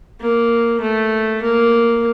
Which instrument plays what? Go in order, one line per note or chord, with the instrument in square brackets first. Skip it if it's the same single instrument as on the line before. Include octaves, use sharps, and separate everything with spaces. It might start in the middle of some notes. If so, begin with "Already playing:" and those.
[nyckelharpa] A#3
A3
A#3